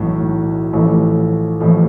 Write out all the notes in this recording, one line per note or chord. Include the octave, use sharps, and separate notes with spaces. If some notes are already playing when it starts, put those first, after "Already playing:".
Already playing: B1 A2 E3
A1 A2 F3 A3
A1 A2 F3 A3